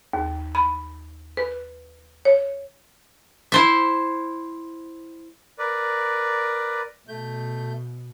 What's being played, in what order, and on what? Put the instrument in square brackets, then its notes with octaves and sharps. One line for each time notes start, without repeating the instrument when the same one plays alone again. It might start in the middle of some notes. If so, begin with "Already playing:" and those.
[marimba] D#2
B5
B4
C#5
[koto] E4 C5 E5
[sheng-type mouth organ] A#4 B4 D5
[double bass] B2 [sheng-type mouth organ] A3 G6